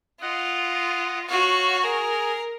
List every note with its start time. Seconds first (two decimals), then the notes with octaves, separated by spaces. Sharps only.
0.21 F4 D#5 F#5
1.29 F#4 C#5 F5
1.83 G#4 A#4